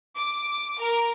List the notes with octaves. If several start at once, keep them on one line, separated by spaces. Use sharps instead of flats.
D6
A#4